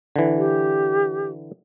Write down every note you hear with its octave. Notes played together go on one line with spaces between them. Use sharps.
D3 E3
G4